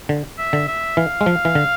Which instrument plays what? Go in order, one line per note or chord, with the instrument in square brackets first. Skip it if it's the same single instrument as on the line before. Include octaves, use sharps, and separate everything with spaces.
[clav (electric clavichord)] D3
[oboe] E5
[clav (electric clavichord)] D3
[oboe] E5
[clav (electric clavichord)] E3 [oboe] F5
[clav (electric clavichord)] G#3
F3
E3
D3